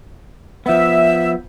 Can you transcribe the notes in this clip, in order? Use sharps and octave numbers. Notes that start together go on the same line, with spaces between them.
F3 B3 E5